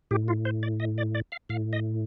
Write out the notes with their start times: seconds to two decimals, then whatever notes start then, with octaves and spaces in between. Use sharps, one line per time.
0.11 A2 G4
0.28 F4
0.45 C5
0.63 D5
0.80 D#5
0.98 D5
1.15 D5
1.32 F5
1.49 A2 F5
1.73 D#5